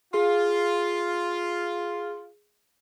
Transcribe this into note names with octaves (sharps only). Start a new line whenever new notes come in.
F4 G#4